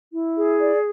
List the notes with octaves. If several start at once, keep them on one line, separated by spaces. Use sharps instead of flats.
E4
G#4
D5